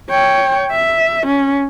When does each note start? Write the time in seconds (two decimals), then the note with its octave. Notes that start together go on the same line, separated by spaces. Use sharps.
0.11 C#5 G5
0.71 E5
1.27 C#4